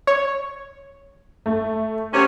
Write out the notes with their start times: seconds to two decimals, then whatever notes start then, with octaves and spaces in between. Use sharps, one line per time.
0.07 C#5
1.46 A3
2.12 F#2 C3 C#4